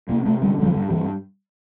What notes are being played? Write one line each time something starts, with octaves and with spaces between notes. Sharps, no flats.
C3 A#3
C3 A3
D3 G3
D3 G3
F3
G2
G2 E3